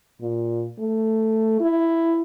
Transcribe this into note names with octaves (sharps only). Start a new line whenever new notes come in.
A#2
A3
E4